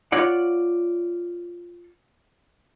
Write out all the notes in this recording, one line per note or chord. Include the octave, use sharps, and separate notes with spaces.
F4 C#5 D5 F#5